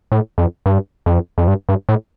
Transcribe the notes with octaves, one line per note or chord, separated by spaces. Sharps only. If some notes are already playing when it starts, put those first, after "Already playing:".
A2
F2
G2
F2
F2
G2
G2
A2